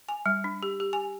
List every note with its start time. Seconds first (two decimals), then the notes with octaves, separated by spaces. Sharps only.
0.09 G#5
0.26 G3
0.44 D4
0.63 G4
0.80 G4
0.93 G#5